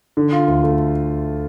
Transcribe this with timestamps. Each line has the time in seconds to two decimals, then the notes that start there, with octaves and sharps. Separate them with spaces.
0.17 D3
0.32 F4
0.48 D2
0.63 A3